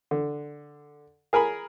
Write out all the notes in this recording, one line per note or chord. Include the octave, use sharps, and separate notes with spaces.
D3
G#4 A#4 G#5 B5